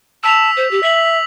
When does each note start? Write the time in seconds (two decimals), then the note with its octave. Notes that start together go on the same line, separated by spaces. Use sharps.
0.24 A5 E6 B6 F7
0.57 C5
0.71 G4
0.83 E5 B6 F#7